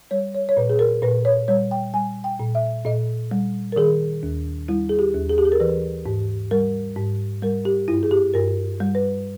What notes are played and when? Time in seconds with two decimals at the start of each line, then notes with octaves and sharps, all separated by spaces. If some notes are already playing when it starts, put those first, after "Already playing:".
0.11 G3 C#5
0.35 C#5
0.49 C#5
0.57 A#2 B4
0.70 G#4
0.79 A#4
1.02 A#2 B4
1.25 C#5
1.48 G3 C#5
1.71 G5
1.94 G3 G#5
2.24 G5
2.39 A#2
2.55 E5
2.85 A#2 D#5
3.31 G3
3.72 A#4
3.76 D#3 G#4
4.23 D#2
4.68 G3 E4
4.89 G#4
4.99 G4
5.14 D#2
5.30 G#4
5.38 G4
5.45 G#4
5.52 A#4
5.60 E3 B4
6.06 G#2
6.51 G3 A#4
6.96 G#2
7.42 G3 A#4
7.65 G4
7.88 G2 E4
8.03 G#4
8.11 G4
8.34 G2 A#4
8.80 G3
8.95 B4